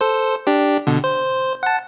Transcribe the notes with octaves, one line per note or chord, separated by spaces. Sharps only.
A4 C5
D4 G4
B2 D3
C5
F#5 A5